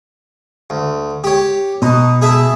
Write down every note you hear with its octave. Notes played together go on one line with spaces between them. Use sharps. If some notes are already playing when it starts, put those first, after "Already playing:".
D2
G4 C#5
B2 D#4
G#4 E5 A5